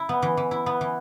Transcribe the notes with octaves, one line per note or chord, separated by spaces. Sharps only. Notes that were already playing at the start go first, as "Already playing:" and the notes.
Already playing: E4
B3
E3
E3
E4
B3
E3